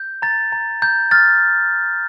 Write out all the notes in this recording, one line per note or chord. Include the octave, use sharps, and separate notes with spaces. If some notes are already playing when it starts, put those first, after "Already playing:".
Already playing: G6
A#5 A6
A#5
A#5 G6
F6 A6